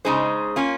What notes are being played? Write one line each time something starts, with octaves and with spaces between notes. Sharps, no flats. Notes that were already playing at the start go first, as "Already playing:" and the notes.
C#3 G#3 D#4 G#4 C5
A#3 C#4 F4